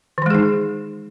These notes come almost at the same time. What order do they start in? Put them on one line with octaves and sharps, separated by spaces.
D#3 E3 G#3 G#4 D#4